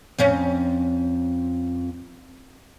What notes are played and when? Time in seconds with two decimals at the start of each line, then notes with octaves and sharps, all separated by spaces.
0.18 F2 C4 C#4